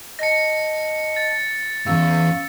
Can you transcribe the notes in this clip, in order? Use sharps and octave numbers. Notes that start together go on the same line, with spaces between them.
D#5 A5 A#6 C#7
A6
E2 G2 C#4 F5 E6